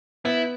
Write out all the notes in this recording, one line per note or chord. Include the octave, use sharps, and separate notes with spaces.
B3 E4